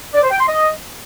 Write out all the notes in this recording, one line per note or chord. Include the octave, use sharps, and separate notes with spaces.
D5
C5
G5
C6
D#5